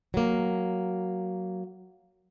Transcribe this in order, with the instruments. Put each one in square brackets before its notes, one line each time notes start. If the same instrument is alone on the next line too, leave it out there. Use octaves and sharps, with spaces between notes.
[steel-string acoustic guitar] F#3 A#3